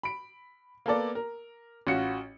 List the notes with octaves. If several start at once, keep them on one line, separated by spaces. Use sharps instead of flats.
B5 D7
A#3 B3 A4 D5
A#4
A1 C#4 F4 F#4 C#7